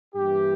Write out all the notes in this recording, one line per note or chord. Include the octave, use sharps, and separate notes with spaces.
G2 E3 A#3 E4 G4